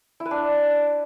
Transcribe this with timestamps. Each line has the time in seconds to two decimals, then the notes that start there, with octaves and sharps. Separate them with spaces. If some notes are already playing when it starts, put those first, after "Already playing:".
0.20 E4
0.26 B4
0.31 D4